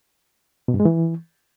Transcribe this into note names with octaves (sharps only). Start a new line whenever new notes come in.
B2
G2
G#3
E3